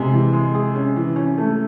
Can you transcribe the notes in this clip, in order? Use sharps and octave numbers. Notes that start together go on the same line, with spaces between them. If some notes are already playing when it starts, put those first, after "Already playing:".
Already playing: C3 G#3
E3
G#3
G#4
C#4
E3
C#4
A3